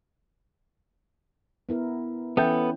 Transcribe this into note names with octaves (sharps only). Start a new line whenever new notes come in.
B3 E4 A#4
E3 B3 C#4 A4 E5 G5 G6